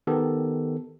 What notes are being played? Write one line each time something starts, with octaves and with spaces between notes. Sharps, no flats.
D#3 B3 G4 A4